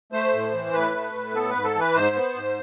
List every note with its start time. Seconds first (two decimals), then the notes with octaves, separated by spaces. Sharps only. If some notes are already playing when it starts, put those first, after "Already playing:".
0.12 A3 C5
0.33 A2
0.53 E3
0.73 A2 B4
0.94 A3
1.14 A2
1.34 B3 A4
1.49 B4
1.55 G#2
1.64 A4
1.75 E3
1.80 B4
1.94 G#2 C5
2.15 B3
2.35 G#2